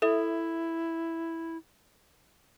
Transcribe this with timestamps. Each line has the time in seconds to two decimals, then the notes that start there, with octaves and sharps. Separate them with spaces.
0.02 E4 A4 E5 D#6